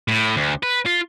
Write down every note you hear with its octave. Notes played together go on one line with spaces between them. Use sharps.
A2
D2
B4
F4